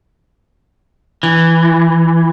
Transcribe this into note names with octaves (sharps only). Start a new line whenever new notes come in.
E3